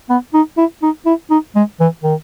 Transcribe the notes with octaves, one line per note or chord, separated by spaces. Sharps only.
B3
D#4
E4
D#4
E4
D#4
G#3
E3
D#3